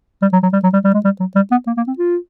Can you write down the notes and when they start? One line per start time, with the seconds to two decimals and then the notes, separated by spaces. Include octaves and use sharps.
0.22 G3
0.33 F#3
0.43 F#3
0.53 G3
0.63 F#3
0.73 G3
0.84 G3
0.94 G#3
1.04 G3
1.20 F#3
1.35 G3
1.51 B3
1.67 A#3
1.77 A#3
1.88 C4
1.98 F4